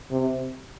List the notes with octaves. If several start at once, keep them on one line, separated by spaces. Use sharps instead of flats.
C3